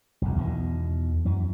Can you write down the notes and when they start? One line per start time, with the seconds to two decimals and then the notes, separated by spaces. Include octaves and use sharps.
0.22 B1 F2
0.36 E2 B2 D3 D#3
1.25 F#2 E3